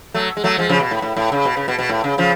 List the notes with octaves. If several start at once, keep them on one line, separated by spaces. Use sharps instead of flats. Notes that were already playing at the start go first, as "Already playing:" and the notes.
F#3 A3
G#3
F#3 A3
F3 G#3
C#3 F3
B2
A2
A2
A2
C#3
B2
C#3
B2
B2
A2
C#3
C#3 F3